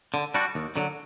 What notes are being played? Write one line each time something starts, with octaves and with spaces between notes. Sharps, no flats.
D3
G3 D4 F#4
D#2
D3 F#3